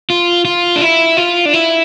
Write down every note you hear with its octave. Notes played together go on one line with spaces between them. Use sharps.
F4
F4
D4
E4
F4
D4
E4